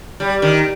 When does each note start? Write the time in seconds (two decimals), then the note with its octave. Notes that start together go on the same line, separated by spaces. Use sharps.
0.20 G3
0.42 D#3